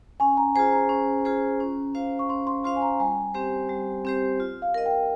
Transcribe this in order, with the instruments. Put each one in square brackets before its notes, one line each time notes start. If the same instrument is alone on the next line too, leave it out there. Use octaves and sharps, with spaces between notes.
[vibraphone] C#4 [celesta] G#5
[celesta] A#5
[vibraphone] F4 G#4 C5 [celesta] G#5
[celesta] A#5
[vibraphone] C#4
F4 G#4 C5
C#4
F4 C5 F5
[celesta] C#6
[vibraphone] C#4 [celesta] C6
[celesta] C6
[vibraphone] F4 C5 F5 [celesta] C6
[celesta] G#5
A#5
A#5
[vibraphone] G3 [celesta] G#5
[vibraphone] C4 G4 C5
G3
C4 G4 C5
F4
[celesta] F5
[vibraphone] A#4 D#5
[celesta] G5